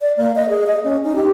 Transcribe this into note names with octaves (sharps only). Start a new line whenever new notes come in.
D5
A#3
D#5
G#4
D#5
C#4
D#4
G4